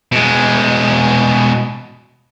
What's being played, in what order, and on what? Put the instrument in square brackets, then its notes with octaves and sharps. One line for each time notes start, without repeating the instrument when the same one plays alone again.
[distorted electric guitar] B2 G#3